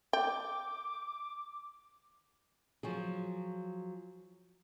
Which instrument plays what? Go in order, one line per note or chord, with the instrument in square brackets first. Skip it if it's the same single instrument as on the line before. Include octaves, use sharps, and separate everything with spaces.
[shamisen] G5 [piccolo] D6
[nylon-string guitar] F3 F#3 G#4